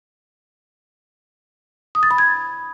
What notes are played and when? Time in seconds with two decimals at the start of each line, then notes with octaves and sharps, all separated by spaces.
1.95 D#6
2.03 A6
2.11 B5
2.18 G#6